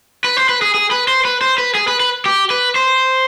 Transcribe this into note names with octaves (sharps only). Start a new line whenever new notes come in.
B4
C5
B4
G#4
G#4
B4
C5
B4
C5
B4
G#4
B4
B4
G4
B4
C5